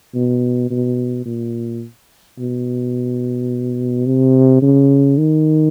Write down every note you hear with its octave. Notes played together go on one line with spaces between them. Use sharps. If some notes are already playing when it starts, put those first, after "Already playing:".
B2
B2
A#2
B2
C3
C#3
D#3